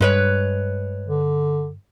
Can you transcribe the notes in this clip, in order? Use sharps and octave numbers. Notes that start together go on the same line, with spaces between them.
G2 G#3 B4 C#5
D3